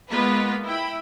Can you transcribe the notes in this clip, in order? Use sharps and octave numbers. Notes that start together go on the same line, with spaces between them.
G#3 A#3 B3 F4 B4
E4 G5 B5